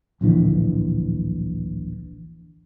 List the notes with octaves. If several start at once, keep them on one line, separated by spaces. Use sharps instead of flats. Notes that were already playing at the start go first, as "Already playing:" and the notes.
D1 A#1 D3 E3